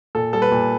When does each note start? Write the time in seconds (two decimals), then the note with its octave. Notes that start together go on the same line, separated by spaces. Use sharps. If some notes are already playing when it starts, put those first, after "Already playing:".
0.15 A#2 A4
0.33 G3 A4
0.42 B4
0.51 A#2